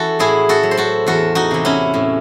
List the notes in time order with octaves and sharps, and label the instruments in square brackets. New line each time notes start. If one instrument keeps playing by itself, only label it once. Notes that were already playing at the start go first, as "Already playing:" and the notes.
Already playing: [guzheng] E3 F#4 A4
A2 E4 G#4
F#4 A4
F#3
C5
F#4 A4
E2 F#4 A4
D#4 F#4
C3 E3
C#4 E4
A2